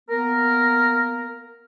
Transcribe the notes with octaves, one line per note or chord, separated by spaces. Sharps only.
A#3 B3 A#4